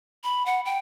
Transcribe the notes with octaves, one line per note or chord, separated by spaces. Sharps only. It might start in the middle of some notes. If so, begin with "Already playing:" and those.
B5
F#5
G5